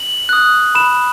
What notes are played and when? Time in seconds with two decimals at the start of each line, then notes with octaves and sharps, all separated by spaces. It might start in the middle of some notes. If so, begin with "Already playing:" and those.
Already playing: F#7
0.29 D#6 F#6
0.75 B5 E7